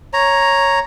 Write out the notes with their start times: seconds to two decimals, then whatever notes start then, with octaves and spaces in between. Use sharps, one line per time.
0.13 C#5 A#5